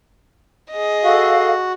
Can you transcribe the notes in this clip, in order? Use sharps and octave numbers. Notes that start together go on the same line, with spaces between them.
G#4 D#5
F#4 A4 F5